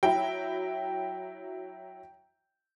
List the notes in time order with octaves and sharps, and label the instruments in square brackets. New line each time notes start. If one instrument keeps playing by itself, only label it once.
[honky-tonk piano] F#3 E4 [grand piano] G5